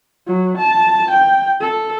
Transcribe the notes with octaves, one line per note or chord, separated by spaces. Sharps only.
F#3
A5
G5
A4